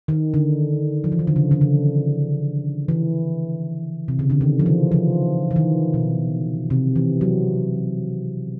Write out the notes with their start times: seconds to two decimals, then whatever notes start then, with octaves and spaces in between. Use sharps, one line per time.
0.08 D#3
0.34 D3
1.04 F3
1.12 E3
1.19 D#3
1.27 D3
1.36 C#3
1.51 D3
1.61 C#3
2.89 E3
4.08 C3
4.19 C#3
4.30 D3
4.41 D#3
4.59 F3
4.66 E3
4.92 F3
5.51 E3
5.56 D#3
5.94 B2
6.70 C3
6.96 E3
7.21 F#3